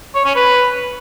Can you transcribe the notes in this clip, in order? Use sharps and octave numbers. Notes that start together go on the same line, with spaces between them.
C#5
C#4
B4